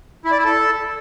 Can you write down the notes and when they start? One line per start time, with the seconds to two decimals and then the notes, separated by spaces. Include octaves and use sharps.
0.25 E4
0.31 D5
0.38 E4
0.44 A4